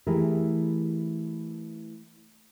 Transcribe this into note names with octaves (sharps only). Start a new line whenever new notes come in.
E3 A3 E4 G4 G#4 A#4